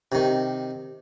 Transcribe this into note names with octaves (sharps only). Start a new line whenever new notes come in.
C3 D#3